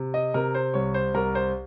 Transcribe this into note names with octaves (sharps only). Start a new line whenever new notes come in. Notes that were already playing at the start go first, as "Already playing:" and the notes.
Already playing: C3
D#5
C3 A#4
C5
C2 C#5
C5
C2 A#4
C5